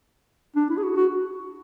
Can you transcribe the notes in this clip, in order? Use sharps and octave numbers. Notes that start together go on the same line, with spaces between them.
D4
E4
G#4
F#4
F#4